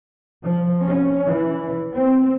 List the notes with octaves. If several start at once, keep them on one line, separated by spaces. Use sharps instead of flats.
F3
C#4
E3
C4